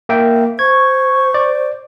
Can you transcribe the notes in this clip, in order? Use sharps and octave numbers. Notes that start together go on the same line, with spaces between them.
A#3 E5 G5
C5 C#6 G#6
D5